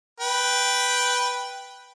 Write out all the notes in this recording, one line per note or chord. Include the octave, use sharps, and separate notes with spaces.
B4 G5